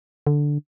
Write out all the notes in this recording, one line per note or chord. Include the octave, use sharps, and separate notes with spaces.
D3